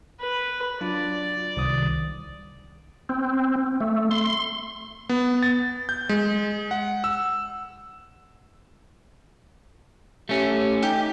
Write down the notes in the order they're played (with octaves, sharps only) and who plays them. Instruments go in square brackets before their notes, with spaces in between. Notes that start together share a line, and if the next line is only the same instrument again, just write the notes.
[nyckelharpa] B4
[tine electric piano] F#3 D4 F4 [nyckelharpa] D5
[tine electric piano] C2 D#3 D#6
[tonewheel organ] C4
A3
C6
[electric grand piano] B3
A6
G6
G#3
F#5
E6
[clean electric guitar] A3 C#4 [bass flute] G4
[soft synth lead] D#4 [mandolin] G4